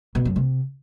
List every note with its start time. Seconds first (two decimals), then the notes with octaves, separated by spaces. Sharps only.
0.15 B2
0.25 F#2
0.36 C3